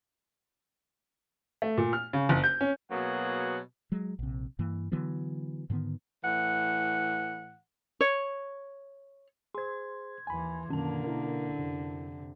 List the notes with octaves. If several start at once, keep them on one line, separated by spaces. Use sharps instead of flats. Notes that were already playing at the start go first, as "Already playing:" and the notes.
A3
A#2
F6
C#3
F#1
G6
C#4
B2 F#3 A#3 B3 G#4 F#5
F#3 G#3
A#1 C3
G2 E3 A#3
D3 E3 F#3 B3
G#2 D3 D#3 B3
A2 E3 F#5
C#5
G#4 C5 C6 G#6
D#2 E3 G#5 B5
F#2 B2 D3 D#3 A#3 C#4 A5
E4 A#4
F2 C3